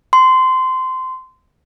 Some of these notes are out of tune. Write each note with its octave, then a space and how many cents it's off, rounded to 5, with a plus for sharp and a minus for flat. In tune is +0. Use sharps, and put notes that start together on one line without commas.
C6 -20